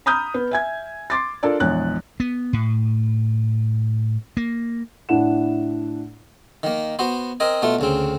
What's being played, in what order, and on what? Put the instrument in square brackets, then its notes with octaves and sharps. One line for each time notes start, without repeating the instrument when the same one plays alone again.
[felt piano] A#5 B5 D#6 F6 G6
B3
E5 G#5 G#6
C6 D6 A6
D4 F4 A4 A#4 D5
A#1 E2 G#3 C#5 F#6
[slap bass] B3
A2
A#3
[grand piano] A2 D4 E4 F#5 E7
[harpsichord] D#3 A#3
B3 F#4 C5
C4 A#4 D#5 G#5
B2 A3 F4
D2 C#3 C4